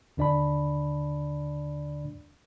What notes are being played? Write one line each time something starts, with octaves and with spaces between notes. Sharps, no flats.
D#2 D3 D4 D5 A5 B5